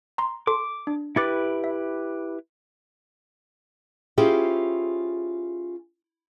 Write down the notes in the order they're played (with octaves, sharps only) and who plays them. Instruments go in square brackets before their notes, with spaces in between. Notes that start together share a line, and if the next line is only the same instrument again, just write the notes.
[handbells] A#5 C6
[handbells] A4 C6 [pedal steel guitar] D6
[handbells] D4
[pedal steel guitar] E4 G4 B4 [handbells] D6 A6 C#7
[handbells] E5
[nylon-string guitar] C#4 E4 F4 G4 G#4 C5